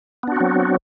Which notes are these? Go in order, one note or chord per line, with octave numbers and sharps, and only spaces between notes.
F#3 B3 C4 D4 F#4